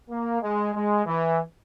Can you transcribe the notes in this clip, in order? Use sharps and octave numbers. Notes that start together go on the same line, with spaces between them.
A#3
G#3
G#3
E3